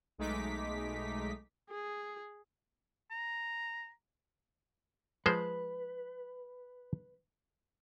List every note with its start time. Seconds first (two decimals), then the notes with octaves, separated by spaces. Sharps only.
0.18 B1 G#3 A3 D#4 D6 B6
1.70 G#4
3.11 A#5
5.26 F3 G#3 B4 C5